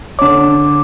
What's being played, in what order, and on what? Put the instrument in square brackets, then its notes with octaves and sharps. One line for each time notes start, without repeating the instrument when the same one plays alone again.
[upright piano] D3 C#5 [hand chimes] D6